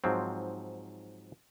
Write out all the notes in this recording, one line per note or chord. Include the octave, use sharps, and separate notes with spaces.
G#2 F3 F#3 C4